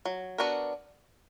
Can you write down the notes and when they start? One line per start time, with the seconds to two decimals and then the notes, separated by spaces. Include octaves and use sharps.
0.05 F#3
0.38 B3 D4 F#4 A#4